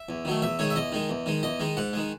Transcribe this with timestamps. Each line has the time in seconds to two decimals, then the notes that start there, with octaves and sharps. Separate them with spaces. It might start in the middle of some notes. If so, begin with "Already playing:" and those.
Already playing: E5
0.09 E2
0.25 D#3 F#3 A3
0.42 E2 E5
0.59 D#3 G#3 C#5
0.70 E5
0.76 E2 D#5
0.92 D#3 G#3
1.09 E2
1.26 D#3 G#3
1.43 E2 D#5
1.60 D#3 G#3
1.77 G#2 F#5
1.93 D#3 G#3